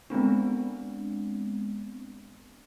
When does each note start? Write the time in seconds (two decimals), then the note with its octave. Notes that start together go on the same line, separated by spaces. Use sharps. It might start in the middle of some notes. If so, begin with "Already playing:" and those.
0.10 G#3 B3 C4 D4